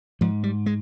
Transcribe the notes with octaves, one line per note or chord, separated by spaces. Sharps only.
G#2 F3
G3
G#3